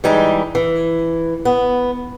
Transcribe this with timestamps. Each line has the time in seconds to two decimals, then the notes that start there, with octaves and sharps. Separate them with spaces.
0.04 E3 G3 G#3 D#4
0.55 E3
1.45 B3